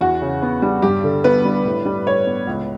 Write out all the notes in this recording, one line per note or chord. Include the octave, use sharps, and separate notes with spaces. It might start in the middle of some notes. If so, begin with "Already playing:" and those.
E2 F#4
C#3
B3
G3
G2 G4
D3
B3 B4
G3
A2
G3
A2 C#5
B3
C#2